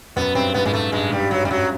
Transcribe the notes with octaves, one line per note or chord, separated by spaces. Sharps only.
F#2 B3
G2 C4
G#2 B3
G#2 G#3
G2 A3
G2 G#3
G#2 G3
G2
F#3
F#2 G3
F#3